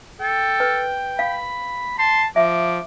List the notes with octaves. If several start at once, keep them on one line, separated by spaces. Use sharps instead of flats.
A4 G5
B4
F5 B5
A5 C6
F3 E5 D6